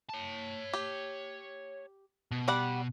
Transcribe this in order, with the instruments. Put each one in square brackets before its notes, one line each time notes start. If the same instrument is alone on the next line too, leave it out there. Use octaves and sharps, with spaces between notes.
[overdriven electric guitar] C#5 A5
[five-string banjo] G4
[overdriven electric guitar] B2
[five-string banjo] G3 D5 F#5